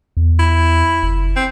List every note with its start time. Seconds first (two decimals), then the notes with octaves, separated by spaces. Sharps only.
0.17 E2
0.39 E4
1.03 F#1
1.36 C4